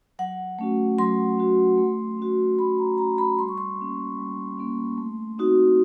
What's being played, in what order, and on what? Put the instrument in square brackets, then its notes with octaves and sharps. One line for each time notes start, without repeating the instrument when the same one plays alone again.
[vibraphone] F#3 F#5
A3 C#4 F#4
F#3 C6
A3 C#4 F#4
A3
C#4 F#4
A3 B5
A#5
C#4 F#4 A#5
B5
G3 C6
C#6
C6
A#3 C#4
G3
A#3 C#4
A3
C4 D#4 F#4